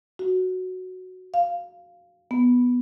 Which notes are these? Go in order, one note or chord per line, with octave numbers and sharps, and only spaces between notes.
F#4
F5
B3